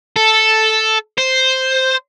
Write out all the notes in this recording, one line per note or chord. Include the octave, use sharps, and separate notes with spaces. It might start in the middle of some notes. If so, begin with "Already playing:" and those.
A4
C5